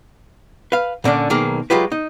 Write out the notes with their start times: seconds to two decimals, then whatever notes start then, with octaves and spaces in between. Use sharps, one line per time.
0.72 B4 F5
1.04 A#2 D3 C#4 D4
1.30 B1 D#3 A#3 G#4
1.70 F#3 G#3 F4 G4 B4
1.92 D#4